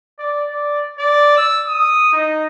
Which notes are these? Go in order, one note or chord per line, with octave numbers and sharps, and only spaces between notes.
D5
D5
D5
E6
D#6
D#4